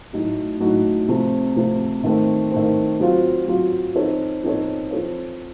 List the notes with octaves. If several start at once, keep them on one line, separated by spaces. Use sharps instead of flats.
A2 F#3 A3 D#4 F#4
A2 F#3 A3 D#4 F#4
C3 F3 A3 C4
C3 F3 A3 C4
D#3 A3 C4
D#3 A3 C4
F#3 C4 F4
F#3 C4 F4
F3 C4 D#4 A4 C#5
F3 C4 D#4 A4 C#5
F3 C4 F4 A4 C#5